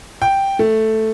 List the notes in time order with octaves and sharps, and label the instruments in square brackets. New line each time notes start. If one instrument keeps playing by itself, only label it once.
[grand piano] G5
A3